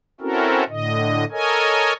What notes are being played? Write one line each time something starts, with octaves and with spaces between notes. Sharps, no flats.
C4 C#4 E4 F#4 A4 A#4
A2 D3 D#5
A4 A#4 C#5 D#5 G#5